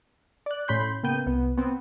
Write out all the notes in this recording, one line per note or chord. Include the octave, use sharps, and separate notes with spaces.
D5 F#6
A2 C#4 B5 C6 G6
C#3 A#3 B3 G5 G6 D#7
C2 B3
B3 C4